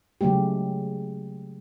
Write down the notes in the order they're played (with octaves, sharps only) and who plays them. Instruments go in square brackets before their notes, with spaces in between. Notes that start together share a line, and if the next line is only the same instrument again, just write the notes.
[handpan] C#3 F#3 G#3 A3 G4